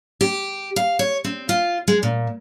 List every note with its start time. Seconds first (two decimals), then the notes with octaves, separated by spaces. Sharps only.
0.21 G4
0.76 F5
0.99 C#5
1.24 C4
1.49 F4
1.88 G#3
2.03 A#2